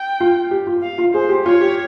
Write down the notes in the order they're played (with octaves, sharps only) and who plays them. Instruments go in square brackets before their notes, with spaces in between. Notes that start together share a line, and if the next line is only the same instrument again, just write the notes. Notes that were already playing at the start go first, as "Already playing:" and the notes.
Already playing: [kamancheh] G5
[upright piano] F4
G4
F4
[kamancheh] F5
[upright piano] F4
[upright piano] G#4 [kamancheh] C5
[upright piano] G4
[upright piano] F4 [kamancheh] C#5
[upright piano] G4